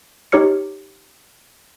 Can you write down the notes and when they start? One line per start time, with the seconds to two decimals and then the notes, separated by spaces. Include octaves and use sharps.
0.32 D#4 G4 C#5 F6 C#7